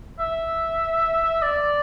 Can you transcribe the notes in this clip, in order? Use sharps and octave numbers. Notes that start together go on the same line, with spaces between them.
E5
D5